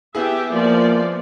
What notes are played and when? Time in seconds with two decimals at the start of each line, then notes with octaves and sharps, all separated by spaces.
0.15 B3 E4 G4 G#4 E5
0.52 F3 A#3 D5